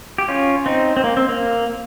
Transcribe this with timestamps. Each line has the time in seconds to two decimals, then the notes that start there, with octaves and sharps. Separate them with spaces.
0.18 G4
0.28 C#4 F4
0.66 C4 D#4
0.97 C4
1.04 A#3
1.17 C4
1.29 A#3